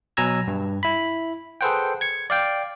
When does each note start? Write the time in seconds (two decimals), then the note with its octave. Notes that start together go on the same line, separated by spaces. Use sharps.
0.17 B2 F#3 G#5 A#5 E6 G#6
0.48 G2
0.83 E4 B5
1.61 G#4 A4 B4 C5 F#5 G5
2.01 G#6 C#7
2.30 D5 F5 G5